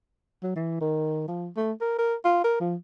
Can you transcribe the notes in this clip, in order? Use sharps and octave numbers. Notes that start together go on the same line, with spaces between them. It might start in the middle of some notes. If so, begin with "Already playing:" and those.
F#3
E3
D#3
F3
A3
A#4
A#4
F4
A#4
F3